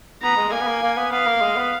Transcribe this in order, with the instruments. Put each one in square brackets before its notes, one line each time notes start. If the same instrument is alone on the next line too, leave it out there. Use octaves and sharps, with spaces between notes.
[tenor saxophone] B3 [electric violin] A#5
[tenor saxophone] G#3
G#3
[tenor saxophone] A#3 [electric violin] G#5
[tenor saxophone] B3
A#3
A#3
B3
[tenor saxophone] B3 [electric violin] F5
[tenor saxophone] A#3
G#3
B3